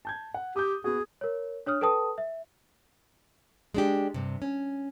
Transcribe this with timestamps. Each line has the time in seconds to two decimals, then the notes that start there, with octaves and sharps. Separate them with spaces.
0.05 A5 G6 G#6
0.34 F#5
0.56 G4 D#6 G6
0.84 B3 F#4 G#4
1.21 A#4 C#5
1.66 D4 C#5 D#6 F6
1.81 A4 B4 G5 A5 D#6
2.18 E5
3.74 G#3 D4 G4
4.14 G2 C3
4.42 C#4